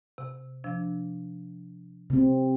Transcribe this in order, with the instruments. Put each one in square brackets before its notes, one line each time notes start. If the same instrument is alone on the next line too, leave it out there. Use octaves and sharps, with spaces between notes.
[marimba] C3
C3 F3 D4
[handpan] C3 C4